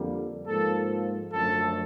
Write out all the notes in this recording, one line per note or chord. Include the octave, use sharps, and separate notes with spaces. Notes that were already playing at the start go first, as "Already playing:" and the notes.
Already playing: F2 D3 G3 A#3
G#2 F3 A#3 A4
F#2 D3 F3 A3 A4